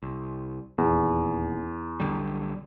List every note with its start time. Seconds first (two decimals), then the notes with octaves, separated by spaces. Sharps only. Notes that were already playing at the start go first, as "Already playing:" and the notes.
0.03 C2
0.78 D#1 E2
2.00 B1 D3 G3